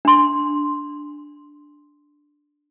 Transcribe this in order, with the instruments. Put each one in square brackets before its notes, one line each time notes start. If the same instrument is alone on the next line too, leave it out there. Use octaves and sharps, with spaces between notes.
[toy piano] D4 C6